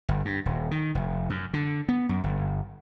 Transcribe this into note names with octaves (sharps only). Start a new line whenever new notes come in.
G1
G2
D#1
D#3
F1
F#2
D3
B3
F#2
G1